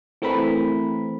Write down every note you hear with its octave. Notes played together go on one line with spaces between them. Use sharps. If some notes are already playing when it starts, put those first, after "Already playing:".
E3 A3 C4 A#4 B5